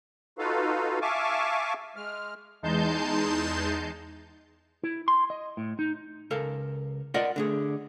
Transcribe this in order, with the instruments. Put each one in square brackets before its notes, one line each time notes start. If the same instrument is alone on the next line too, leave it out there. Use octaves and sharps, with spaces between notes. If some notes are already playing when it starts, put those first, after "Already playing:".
[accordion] D#4 F4 F#4 A4 B4 F5
E5 F5 G#5 A5 C#6 D6
G#3 F6
[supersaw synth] E2 G#3 D#4 A5 C6 G6
[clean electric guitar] E4
C6
D#5
A2
D#4
[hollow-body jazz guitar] C#2 A4 A#4 F5
F4 A#4 D5 D#5 F#5
D3 A3 G#4